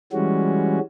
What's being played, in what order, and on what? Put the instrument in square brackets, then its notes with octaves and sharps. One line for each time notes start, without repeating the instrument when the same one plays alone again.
[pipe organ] E3 G3 G#3 C#4 F#4